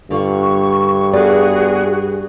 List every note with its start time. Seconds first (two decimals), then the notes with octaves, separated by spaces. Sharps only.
0.11 G2 D3 F4 C#6
1.13 B3 F#4 G#4 A4 D5